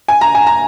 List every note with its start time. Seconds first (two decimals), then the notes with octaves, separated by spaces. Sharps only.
0.08 G#5
0.21 A#5
0.35 G#5
0.47 A#5